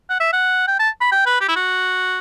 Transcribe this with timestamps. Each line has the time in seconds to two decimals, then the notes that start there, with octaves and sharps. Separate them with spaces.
0.09 F#5
0.20 E5
0.33 F#5
0.68 G5
0.79 A5
1.01 B5
1.12 G5
1.26 B4
1.41 G4
1.48 E4
1.56 F#4